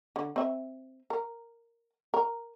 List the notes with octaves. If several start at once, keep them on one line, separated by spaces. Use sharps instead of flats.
D3
C4 E5
A#4
A#4